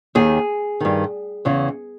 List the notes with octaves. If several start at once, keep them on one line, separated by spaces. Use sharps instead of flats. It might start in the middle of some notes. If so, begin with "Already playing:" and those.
D#2 D#3 G#4
G2 D#3
E2 C#3 E3